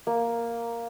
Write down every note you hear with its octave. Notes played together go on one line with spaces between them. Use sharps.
A#3